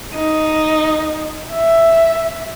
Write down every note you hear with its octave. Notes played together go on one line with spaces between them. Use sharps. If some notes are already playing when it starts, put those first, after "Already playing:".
D#4
E5